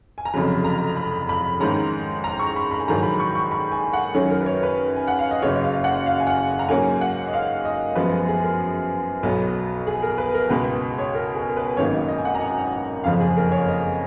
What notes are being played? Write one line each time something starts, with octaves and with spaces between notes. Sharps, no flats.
G#5
A#5
F1 F2 C#3 F#3 B5
A#5
B5
B5
G#2 D#3 G#3 C#4 A#5
A#5
C#6
B5
B5
G#5
A#1 G#2 D#3 F#3 A#5
B5
C#6
C#6
B5
G#5
F#5
F#2 D#3 F#3 C#4 G#4
A#4
B4
C#5
B4
G#5
F#5
F5
D#5
F#1 F#2 C#3 C#5
F5
F#5
F5
G#5
F#5
A#5
G#2 F#3 A#3 C#4 G#5
F#5
D#5
F5
D#5
F#2 F3 G#3 B3 B4
G#4
G#4
A#4
B1 B2 F#3 B3
G#4
A#4
B4
A#4
C#2 B2 G#3 B4
C#5
A#4
G#4
A#4
B4
G#1 F#2 D#3 A#3 C#4 C#5
D#5
D#5
G#5
F#5
A#5
G#5
F#1 F2 F3 F5
G#4
A#4
C#5
D#5